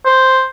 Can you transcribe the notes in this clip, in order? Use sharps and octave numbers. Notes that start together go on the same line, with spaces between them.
C5